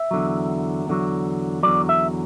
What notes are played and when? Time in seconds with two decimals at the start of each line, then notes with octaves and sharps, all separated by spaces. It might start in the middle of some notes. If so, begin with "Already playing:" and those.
Already playing: E5
0.11 E2 D3 F#3
0.87 E2 D3 F#3
1.63 E2 D3 F#3 D5
1.89 E5